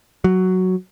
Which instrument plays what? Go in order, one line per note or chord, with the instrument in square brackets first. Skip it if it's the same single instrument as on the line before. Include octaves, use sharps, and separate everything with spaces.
[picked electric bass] F#3